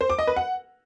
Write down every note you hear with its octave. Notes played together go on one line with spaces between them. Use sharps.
C5
D6
D#5
B4
F#5